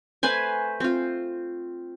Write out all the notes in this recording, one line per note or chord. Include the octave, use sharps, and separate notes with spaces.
A3 B4 C5 G#5
C4 F4